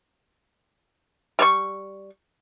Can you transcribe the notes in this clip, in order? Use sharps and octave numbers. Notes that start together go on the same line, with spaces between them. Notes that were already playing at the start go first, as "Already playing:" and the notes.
G3 C#5 C#6